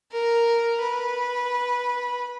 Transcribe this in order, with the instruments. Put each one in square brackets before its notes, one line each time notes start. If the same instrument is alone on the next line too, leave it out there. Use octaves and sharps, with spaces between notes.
[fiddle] A#4
B4